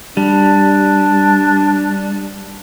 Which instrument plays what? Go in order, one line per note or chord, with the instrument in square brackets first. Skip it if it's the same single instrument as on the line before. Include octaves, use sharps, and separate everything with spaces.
[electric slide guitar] G3 [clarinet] D4